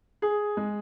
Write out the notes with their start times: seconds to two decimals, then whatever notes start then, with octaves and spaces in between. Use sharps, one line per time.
0.22 G#4
0.57 G#3